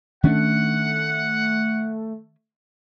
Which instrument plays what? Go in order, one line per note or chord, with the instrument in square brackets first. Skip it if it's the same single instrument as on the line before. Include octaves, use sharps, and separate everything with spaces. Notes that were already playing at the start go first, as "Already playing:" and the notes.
[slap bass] D#3 C#4 D4 [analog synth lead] A3 [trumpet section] F#5